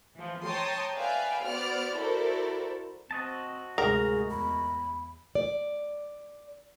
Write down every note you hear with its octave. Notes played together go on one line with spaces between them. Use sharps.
E3 F3
C#5 G5 A5 A#5 C6 D#6
B4 D5 E5 F5 G5 G#5
B3 F#4 C5 D5 F6
E4 F#4 A4 A#4 C5 D5
C4 F#4 D#5 A5
D2 G#2 C3 G#4 A#4
E2 B5
D5